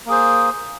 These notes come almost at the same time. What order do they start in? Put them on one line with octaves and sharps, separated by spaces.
A#3 G#4 C5